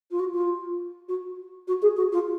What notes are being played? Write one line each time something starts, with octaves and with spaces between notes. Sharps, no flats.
F4
F#4
F4
F#4
F#4
G#4
F#4
F4